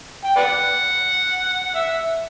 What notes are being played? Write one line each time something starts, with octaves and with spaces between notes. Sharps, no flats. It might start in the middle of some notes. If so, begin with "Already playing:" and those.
G5
B4 D5 F#5
E5